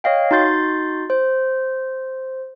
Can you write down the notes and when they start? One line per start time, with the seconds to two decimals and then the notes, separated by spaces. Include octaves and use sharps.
0.04 C#5 D#5 F5 G5
0.31 D#4 F#4 C6 G6 A6
1.10 C5